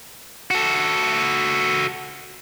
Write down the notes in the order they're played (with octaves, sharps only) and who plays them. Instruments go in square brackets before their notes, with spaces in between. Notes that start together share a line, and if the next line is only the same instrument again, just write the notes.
[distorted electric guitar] F#4 A4